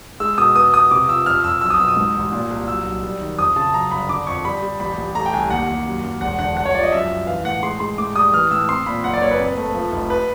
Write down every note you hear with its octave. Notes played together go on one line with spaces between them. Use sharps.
G#3 E6
B2 D#6
B3 D#6
B3 D#6
C3 D6
F3 E6
F2 F6
F2 E6
B1 E6
D#6
B2 E6
D#6
G#2
A1
A#2
C2
F#3 E6
B1
G3
D#3
F2 D#6
C#3 A5
F#2 A#5
G1 B5
D3 D6
F2 C#6
G3 B5
G3
A1 B5
A1
A3 A#5
G5
C2 G#5
D#2 F#5
D#2
F#2
F#2
E1 F#5
D3 F#5
C2 F#5
C#5
F3 D5
D#5
F#2 E5
G1
E3 F5
A2 F#5
G#3 C6
G#3 C6
A2 D6
G3 D#6
E3 F6
A2 E6
C4 C6
A#2 B5
F#1 F#5
D5
F#1 C#5
B4
C4
A3
F3
F1
B4